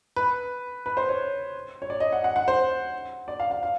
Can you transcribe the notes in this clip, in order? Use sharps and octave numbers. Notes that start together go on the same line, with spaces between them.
B4
B4
C5
C#5
C#5
D5
D#5
F#5
F#5
F#5
C5
D5
F5
F5
F5